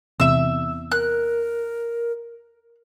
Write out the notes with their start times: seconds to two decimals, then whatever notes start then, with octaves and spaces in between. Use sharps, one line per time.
0.20 E2 C3 E5 E6
0.92 A#4 F#6